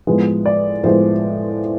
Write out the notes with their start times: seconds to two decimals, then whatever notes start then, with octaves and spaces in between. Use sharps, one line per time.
0.07 A2 F3 G#3 B3
0.46 D5
0.84 A2 F3 G#3 B3 C5